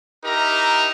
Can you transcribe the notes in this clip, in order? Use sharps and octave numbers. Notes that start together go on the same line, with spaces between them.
D#4 E4 G4 A#4 E5 A#5